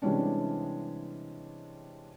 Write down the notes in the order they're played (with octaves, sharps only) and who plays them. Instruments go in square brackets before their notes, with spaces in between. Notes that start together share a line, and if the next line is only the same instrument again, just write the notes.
[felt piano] C3 E3 G3 G#3 C#4 D4